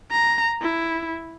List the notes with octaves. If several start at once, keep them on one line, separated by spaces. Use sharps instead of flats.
A#5
E4